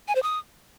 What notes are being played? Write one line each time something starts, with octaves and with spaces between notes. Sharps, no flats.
G#5
C5
D#6